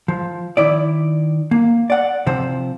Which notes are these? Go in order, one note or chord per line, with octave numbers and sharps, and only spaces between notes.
F3
D#3 E4 D5
A#3
D5 F#5
C3 F3 C5